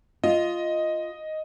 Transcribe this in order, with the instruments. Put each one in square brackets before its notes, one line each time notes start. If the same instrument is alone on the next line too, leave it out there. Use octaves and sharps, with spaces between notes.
[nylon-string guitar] F4 [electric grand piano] D#5